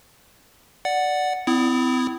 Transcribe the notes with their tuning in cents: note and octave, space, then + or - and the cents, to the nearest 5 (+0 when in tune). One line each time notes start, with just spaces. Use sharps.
D5 +0 F#5 +0
C4 -40 E4 +0 D#6 -10